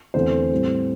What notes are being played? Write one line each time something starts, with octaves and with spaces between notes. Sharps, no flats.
E2 D3 A3 C4 C5
A2 G3 C4